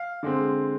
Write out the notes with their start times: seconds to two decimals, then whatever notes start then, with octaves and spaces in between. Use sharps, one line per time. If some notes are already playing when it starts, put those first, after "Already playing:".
Already playing: F5
0.23 D3 G#3 C4